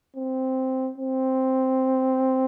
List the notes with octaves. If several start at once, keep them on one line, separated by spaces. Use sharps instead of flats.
C4
C4